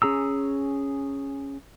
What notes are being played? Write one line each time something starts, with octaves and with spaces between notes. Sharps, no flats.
C#4 G#4 A#5 E6